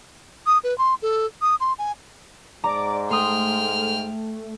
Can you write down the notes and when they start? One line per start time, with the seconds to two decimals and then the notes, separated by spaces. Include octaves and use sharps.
0.46 D#6
0.64 B4
0.78 C6
1.02 A4
1.42 D#6
1.60 C6
1.79 G#5
2.64 G#2 D5 A#5 D6
3.10 A3 G5 C6 D#6 F6